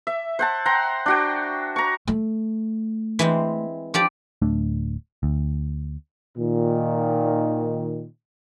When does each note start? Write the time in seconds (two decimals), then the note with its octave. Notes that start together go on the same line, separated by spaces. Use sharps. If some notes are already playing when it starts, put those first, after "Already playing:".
0.07 E5
0.39 C5 F#5 A5
0.65 F#5 G5 A#5 C6
1.06 D4 F#4 G5
1.76 A#5 C#6
2.07 A3
3.19 E3 G#3 C4
3.94 F3 G4 D5
4.42 D1 A3 D4
5.23 D2
6.38 A#2 D#3